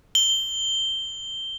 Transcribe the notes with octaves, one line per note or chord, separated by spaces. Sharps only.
G7